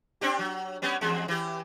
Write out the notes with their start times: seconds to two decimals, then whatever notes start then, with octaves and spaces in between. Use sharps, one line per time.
0.21 C4 D4 G4
0.39 F#3
0.82 G3 B3 C#4
1.01 E2 G#3
1.28 E3 G4